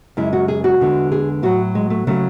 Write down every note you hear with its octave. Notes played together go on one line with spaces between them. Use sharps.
F#2 C#3 G#3 E4
F#4
G#4
F#4
E2 D3 G#3
G#4
A2 F#3 F#4
G#3
A3
C#3 F#3 A3